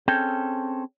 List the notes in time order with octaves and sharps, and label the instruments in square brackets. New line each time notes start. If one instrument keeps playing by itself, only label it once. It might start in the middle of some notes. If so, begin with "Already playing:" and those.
[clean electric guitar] C4 C#4 G#4 A4 G5